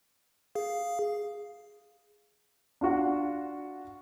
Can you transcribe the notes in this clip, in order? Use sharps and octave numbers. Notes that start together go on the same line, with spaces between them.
G#4 F5
D4 F4 F#4